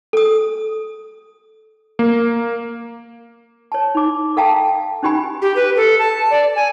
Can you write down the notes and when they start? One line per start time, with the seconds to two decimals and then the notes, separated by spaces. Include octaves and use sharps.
0.13 A4 D#6
1.99 A#3
3.72 C#5 A5
3.95 D#4 D6
4.37 A4 E5 F5 G5 A5 A#5
5.03 C#4 D#4 G4 G#5 B5
5.42 G4
5.56 B4
5.76 A4
5.99 A5
6.31 D5
6.56 G#5